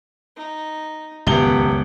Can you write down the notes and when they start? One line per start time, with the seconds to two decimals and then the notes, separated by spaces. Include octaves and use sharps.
0.36 D#4
1.27 D#1 C#2 F#2 A#2 B3 G7